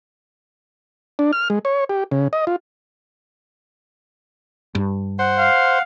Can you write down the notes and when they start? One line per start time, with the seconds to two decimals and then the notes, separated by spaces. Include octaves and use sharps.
1.19 D4
1.33 F6
1.50 G#3
1.65 C#5
1.89 G4
2.12 C#3
2.33 D#5
2.47 F4
4.75 G2
5.19 C5 F#5
5.39 F5